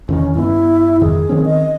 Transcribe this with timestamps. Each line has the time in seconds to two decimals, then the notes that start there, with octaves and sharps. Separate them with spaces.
0.08 E2 D3 D#3 C#4
0.35 G2 B3 E4
1.01 F2 G#2 D#3 G#4
1.29 D#3 C4 C#4
1.45 D#5